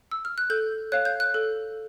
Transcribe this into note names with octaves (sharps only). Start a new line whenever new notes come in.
E6
F6
F#6
A4 G6
C#5 F5 F#6
G6
F#6
A4